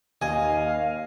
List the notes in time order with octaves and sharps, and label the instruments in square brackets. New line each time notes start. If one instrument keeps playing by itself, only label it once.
[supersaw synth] D#2 [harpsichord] D#5 [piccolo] F5 [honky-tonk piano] G#5